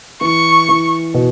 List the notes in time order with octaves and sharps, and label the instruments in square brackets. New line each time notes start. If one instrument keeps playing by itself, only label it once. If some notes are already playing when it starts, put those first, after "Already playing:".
[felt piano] E3 [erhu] C#6
[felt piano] E3
B2